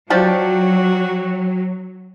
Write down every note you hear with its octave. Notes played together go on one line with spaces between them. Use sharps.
F3 F#3 D4 F#4 G4